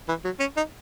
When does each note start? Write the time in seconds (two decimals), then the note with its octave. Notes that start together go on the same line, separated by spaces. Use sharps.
0.08 E3
0.25 F#3
0.40 C#4
0.57 D#4